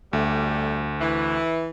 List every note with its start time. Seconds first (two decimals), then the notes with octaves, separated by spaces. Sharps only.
0.13 D2 G3 A3
1.01 E3